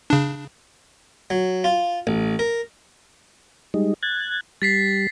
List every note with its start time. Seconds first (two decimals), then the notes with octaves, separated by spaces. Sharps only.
0.10 C#3 D4
1.30 F#3
1.64 F4
2.07 A1
2.39 A#4
3.74 G3 G#3 D#4
4.03 F#6 G#6 A6
4.62 G3 A6 B6 C7